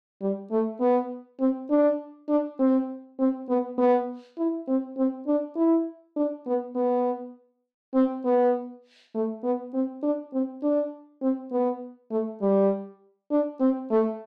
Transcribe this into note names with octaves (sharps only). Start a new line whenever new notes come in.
G3
A3
B3
C4
D4
D4
C4
C4
B3
B3
E4
C4
C4
D4
E4
D4
B3
B3
C4
B3
A3
B3
C4
D4
C4
D4
C4
B3
A3
G3
D4
C4
A3